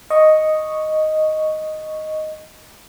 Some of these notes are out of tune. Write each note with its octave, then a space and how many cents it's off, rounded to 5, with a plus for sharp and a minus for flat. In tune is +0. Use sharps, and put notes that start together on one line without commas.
D#5 +0 C#6 +0